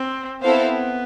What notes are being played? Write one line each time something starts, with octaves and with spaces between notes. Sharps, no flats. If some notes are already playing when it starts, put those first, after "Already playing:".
Already playing: C4
B3 C4 E4 A4 C5 F5